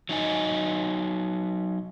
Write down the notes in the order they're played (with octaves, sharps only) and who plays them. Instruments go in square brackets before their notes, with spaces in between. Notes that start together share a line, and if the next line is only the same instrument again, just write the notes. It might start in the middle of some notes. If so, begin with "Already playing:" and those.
[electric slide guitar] F#3 D#4 D#5 G#5